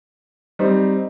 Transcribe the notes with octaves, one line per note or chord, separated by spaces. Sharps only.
G3 C4 D#4